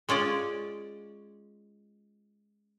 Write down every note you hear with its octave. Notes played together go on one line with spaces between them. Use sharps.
G#3 C#4 F4 D5